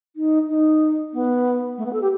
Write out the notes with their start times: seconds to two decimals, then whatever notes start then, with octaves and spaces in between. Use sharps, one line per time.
0.16 D#4
0.48 D#4
1.13 B3
1.77 A3
1.85 B3
1.93 A4
2.01 G4